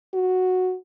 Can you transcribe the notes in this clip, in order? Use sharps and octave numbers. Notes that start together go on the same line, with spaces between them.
F#4